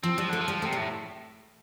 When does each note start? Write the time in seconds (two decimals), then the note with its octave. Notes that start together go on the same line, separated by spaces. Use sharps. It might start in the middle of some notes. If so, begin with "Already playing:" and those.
0.03 F3 C4
0.17 F3 G3
0.29 D3 A3
0.41 F3
0.48 G3
0.62 C3 A3
0.73 G3
0.77 A2